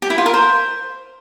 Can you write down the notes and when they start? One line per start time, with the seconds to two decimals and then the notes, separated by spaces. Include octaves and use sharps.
0.02 G4
0.10 E4
0.18 F4
0.26 A#4
0.34 C5